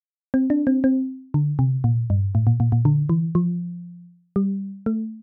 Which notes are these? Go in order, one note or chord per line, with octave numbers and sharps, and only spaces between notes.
C4
D4
C4
C4
D3
C3
A#2
G2
A2
A#2
A#2
A#2
D3
E3
F3
G3
A3